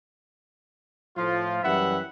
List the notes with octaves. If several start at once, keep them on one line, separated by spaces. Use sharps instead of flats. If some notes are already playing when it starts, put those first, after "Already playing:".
A2 F3 F4
F#2 E3 G3 E5 F#5 B5